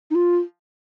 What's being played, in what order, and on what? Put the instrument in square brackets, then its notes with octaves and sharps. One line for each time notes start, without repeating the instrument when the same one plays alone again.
[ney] D#4
F4